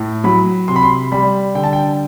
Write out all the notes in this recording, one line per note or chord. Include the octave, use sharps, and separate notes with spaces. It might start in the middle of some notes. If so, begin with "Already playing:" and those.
Already playing: A2
F#3 B5
C3 C6
B5
C6
G3 B5
D3 G5
A5
G5